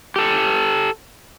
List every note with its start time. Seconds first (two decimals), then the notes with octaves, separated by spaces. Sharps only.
0.16 G4 A4